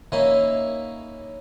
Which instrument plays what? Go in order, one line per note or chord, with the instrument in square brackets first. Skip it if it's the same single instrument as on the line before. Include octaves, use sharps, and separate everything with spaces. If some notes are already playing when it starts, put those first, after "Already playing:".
[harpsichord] A#3 C#4 D#4 E4 E5 F5